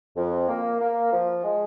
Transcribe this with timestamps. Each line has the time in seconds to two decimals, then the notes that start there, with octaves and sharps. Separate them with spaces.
0.17 F2
0.48 A#3
0.79 A#3
1.12 F3
1.43 G#3